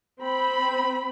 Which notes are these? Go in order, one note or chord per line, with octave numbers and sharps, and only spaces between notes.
C4 B5